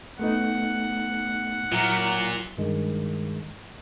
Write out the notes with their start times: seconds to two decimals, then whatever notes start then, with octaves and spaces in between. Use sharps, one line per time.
0.19 A3 B3 D#4 F#5
1.72 A#2 F#3 E4 A#5
2.58 G2 D#3 G#3